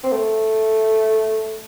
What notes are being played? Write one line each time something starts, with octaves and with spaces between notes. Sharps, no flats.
C4
A3